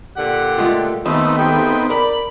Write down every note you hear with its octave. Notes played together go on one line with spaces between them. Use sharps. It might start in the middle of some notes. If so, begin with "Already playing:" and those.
A#2 D3 G4 F#5
G#3 A3 F4
D#2 A3 B3 C4 D#4
G#3 A3 G4 G5
A#4 D5 B5